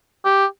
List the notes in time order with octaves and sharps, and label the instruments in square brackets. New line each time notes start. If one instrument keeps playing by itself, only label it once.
[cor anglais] G4